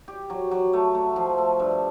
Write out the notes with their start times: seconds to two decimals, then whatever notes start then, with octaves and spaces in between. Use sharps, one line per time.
0.08 G4
0.30 F#3
0.51 F#3
0.73 A3
0.95 A3
1.16 F3
1.38 A3
1.60 G2